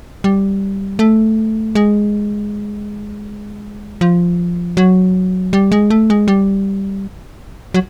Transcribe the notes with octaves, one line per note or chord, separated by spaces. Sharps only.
G3
A3
G#3
F3
F#3
G3
G#3
A3
G#3
G3
F#3